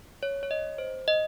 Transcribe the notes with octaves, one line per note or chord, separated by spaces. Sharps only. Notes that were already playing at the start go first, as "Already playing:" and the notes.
C#5
C#5
D#5
C5
D#5